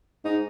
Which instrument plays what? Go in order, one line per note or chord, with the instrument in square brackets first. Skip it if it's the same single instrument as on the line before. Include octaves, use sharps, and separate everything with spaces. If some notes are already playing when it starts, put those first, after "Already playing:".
[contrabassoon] G#2 [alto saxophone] D#4